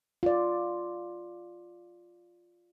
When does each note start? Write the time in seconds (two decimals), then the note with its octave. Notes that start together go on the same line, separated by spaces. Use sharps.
0.23 F4 D5